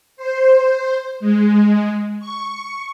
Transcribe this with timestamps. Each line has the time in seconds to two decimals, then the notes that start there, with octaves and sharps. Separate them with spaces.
0.17 C5
1.20 G#3
2.20 C#6